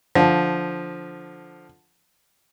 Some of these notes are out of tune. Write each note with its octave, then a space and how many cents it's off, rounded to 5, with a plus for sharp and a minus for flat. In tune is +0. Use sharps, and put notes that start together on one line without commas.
D3 +0 F3 +0